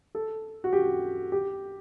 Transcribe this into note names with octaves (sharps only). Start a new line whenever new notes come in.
A4
F#4
G4
G4